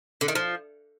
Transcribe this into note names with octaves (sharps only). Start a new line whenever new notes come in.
D3
D#3
F3